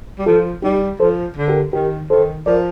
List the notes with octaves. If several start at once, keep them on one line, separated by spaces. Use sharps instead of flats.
G3
F3 F4 A4
G3 D#4 G4
F3 A4 C5
D3
G4 A#4
D#3 G4 A#4
D#3 A4 C5
F3 A#4 D5